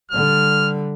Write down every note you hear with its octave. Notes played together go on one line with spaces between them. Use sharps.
D3 G3 F6